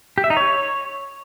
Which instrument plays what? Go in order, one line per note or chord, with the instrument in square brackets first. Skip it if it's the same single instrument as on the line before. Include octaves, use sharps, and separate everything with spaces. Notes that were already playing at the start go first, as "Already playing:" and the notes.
[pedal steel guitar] G4
E5
D#4
C#5